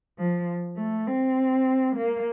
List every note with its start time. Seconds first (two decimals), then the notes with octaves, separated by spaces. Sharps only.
0.18 F3
0.77 A3
1.07 C4
1.96 A#3